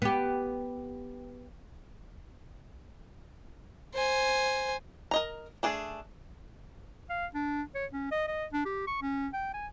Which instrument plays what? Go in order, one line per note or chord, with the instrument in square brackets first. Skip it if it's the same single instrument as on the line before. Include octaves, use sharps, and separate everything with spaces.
[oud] B3 G4
[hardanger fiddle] C5 G#5
[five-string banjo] A#4 D#5 A#5
A3 D4 G#4
[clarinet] F5
D4
C#5
C#4
D#5
D#5
D4
G4
C#6
C#4
G5
G#5